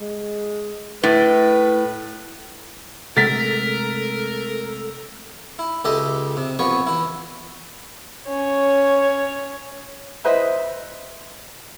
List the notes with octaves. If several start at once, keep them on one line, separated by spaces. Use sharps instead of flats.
G#3
A2 B4
C3 G#3 A3 A4 A#4 A6 B6
E4
C#2 G4 A4 D#5 E5
C3
C2 F3 B3 C#5 C#6
E3 E4
C#4 C#5
E4 B4 C5 D#5 E5